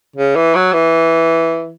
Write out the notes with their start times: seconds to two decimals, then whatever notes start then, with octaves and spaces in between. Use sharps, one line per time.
0.16 C#3
0.36 E3
0.55 F#3
0.73 E3